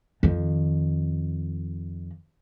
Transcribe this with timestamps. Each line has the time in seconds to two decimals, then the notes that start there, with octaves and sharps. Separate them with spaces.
0.23 F2 D#3